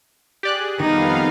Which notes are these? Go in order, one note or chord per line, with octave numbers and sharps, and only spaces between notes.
G4 G#4 D5 F#6
F2 D#3 G3 B3 D#4 F5